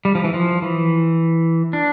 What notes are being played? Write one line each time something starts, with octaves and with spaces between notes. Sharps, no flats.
G3
F3
E3
F3
E3
D4